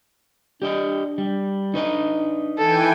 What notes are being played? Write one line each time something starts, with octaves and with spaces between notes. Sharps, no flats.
D4 G4 D5 D#5
G3
D4 D#4 B4 D#5
E3 A4 G5 G#5